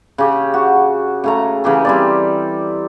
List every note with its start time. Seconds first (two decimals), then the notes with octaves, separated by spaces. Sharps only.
0.18 C#3 G4
0.54 F#4
1.24 C#3 A3 A#5
1.64 C#3 E3 G4 G#4
1.85 G3 C4 D5